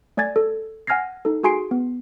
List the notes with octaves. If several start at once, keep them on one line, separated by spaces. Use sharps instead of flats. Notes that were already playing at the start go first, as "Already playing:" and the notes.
A3 D5 G#5 G#6 A6
A4
F#5 G#5 F6 G#6 A#6 C7
D#4 A4
F#4 G#4 G#5 C6 C7 D7
B3